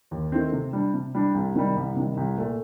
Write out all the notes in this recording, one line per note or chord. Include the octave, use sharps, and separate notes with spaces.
D#2
D#3 A3 C4
C3
G3 D4
C3
G3 D4
C2
C3 D#3 G3
C2
C3 D#3 G3
C2
A#2 A3